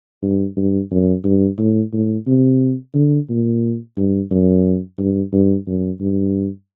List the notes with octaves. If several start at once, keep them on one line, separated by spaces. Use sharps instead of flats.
G2
G2
F#2
G2
A2
A2
C3
D3
A#2
G2
F#2
G2
G2
F#2
G2